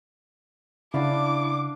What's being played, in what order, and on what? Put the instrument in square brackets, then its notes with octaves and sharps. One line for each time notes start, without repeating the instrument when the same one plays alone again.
[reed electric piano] C#3 [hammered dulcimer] D4 F5 [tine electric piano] E4 D5 F#5 [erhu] D6